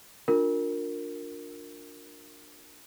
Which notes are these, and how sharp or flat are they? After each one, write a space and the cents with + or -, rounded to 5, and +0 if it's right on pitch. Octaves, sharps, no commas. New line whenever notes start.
D4 +0 F4 +20 A#4 -15